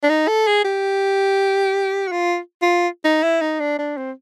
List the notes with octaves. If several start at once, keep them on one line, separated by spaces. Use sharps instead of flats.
D4
D#4
A4
G#4
G4
F#4
F4
F4
D#4
E4
D#4
D4
D4
C4